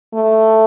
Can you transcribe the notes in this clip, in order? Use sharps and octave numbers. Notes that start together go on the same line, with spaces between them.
A3